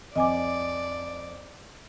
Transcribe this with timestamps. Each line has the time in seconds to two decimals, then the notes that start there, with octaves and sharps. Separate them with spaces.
0.16 F2 D5 D#5 G#5 D6